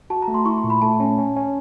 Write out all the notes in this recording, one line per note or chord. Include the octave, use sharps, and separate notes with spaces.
F#4 A5
A#5
A3
C6
E4 C#6
C6
A#2
B5
A3 A5
C#4
C#4
C#4